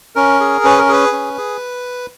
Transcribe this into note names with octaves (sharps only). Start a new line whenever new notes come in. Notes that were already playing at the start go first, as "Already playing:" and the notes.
C#4 A#4
G#4
C#4 B4
A#4
G#4 B4
C#4
G#4